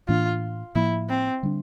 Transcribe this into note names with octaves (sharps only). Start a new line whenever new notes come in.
A2 E3 A#3 D4 F4
A2 F3 A#3 E4
C4
D3 G3 D4